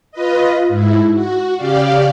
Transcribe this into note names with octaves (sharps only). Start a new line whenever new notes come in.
F4 B4 D#5
G#2 E4
F#4
C#3 G4 D5 F5